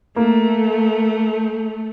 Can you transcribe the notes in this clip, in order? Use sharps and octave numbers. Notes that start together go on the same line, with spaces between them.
A3 A#3